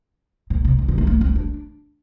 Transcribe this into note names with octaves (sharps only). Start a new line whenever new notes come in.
A#2
C3
D3
D3
A3
A#3
C4
D4